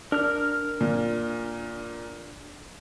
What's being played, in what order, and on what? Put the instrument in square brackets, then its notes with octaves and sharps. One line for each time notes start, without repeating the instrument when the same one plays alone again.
[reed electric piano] D4 [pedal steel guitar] A#4 F6
[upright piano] A#2